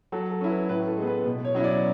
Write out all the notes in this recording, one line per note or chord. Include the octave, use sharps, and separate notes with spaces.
F#3 A4
A4
C#4 E4
B4
A2 B4
A4
G#3 B3
B4
B2
C#5
F#3 C#4 E4
D5